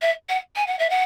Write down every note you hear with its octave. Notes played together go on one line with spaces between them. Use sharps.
E5
F#5
G#5
F#5
E5
F#5